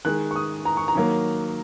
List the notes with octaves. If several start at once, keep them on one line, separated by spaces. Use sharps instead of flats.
D#3 G#3 F#6
C#6
D#6
A#5
C#6
A#5
D#3 F#3 A#3